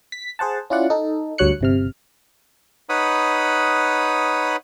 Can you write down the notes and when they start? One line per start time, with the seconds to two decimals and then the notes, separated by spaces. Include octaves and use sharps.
0.12 B6
0.39 G#4 C5 F#5 A5
0.70 C#4 E4 F4 D5 F#5
0.90 D#4 A4
1.38 D2 G2 F#3 C#5 F#6 C#7
1.61 G1 C3 F6
2.89 D#4 B4 C#5 F#5 B5 D#6